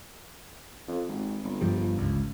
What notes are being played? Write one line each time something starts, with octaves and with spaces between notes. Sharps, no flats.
F2
G#1
G1
G2 F3 G3
G1 C#2